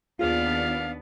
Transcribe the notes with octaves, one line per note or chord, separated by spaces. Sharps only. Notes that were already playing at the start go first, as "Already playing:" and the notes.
D#2 B3 D4 F4 G#4 F5